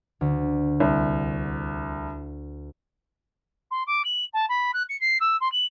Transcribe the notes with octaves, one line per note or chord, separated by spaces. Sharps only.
D2
C2
C6
D6
F#7
A5
B5
F#6
C#7
C7
E6
C6
F#7